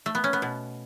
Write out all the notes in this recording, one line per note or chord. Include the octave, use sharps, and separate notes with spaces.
A3
B3
C#4
B3
B2